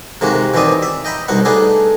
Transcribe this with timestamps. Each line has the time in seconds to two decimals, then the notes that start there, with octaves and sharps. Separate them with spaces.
0.21 C3 D#3 G#3 A#3 F#4
0.54 B2 D#3 E3 C4 D5 D#6
0.82 E5
1.05 D#5 G5 A#5 B5
1.28 C2 B2 D#4 F#5
1.45 A3 B3 D4 D#4 G#4